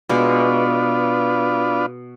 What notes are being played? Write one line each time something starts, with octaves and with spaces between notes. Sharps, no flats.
B2 G#3 B3 D4 F4